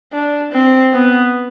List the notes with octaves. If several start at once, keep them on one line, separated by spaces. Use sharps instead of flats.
D4
C4
B3